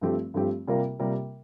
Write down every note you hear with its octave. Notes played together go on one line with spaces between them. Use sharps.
G2 F3 A3 C4 G4
G2 F3 A3 C4 G4
C3 G3 A#3 F4 A#4
C3 G3 A#3 F4 A#4